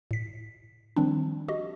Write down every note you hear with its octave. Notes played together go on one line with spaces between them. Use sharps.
A2 B6
D#3 F3 G3 C4 D4
F#4 G4 D#5